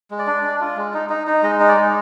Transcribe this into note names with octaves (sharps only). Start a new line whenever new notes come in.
G#3
D5
D4
D4
F4
G#3
D#4
D#4
D#4
G#3 D#5
D#4
D5
G#3